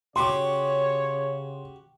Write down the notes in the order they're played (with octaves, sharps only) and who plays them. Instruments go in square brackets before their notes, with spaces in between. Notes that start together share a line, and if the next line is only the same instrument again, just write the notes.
[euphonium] C#3 [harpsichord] F#4 G4 [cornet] C#5 [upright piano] C6 D6